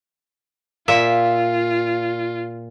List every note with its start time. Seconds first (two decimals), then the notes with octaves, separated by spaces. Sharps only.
0.88 A#2 F4 E5